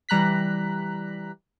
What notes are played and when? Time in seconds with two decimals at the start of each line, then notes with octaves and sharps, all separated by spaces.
0.09 E3 G3 A#5 F#6 B6